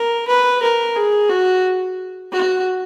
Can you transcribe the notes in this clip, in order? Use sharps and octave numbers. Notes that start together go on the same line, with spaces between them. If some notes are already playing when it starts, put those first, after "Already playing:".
Already playing: A#4
B4
A#4
G#4
F#4
F#4